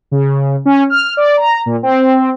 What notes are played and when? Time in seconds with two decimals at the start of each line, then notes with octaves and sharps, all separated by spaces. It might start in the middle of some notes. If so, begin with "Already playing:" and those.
0.11 C#3
0.65 C#4
0.90 F6
1.17 D5
1.37 A#5
1.66 A#2
1.83 C4